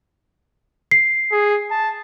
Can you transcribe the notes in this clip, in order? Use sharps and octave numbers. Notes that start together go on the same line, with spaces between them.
C7
G#4
A5